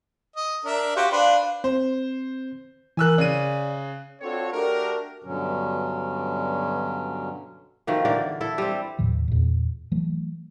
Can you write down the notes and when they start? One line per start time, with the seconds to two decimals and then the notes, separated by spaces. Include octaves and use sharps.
0.36 D#5
0.65 D4 A#4 E5
0.96 F#4 G4 C5 F5
1.11 D4 B4 C5
1.64 C4 C5
2.97 E3 A#4 G#5 E6 F#6
3.18 C#3 D5 D#7
4.21 C4 D4 F4 F#4 A4 C#5
4.52 A3 D4 F#4 G4 A4 A#4
5.24 G2 B2 D3 F#3 C#4
7.87 B2 D#3 F3 A3
8.05 D3 E3 A#4 D5
8.41 E4 A4
8.58 G3 C4
8.99 D#2 A2 D#3 F3
9.28 E2 A#2
9.92 E3 F#3 A3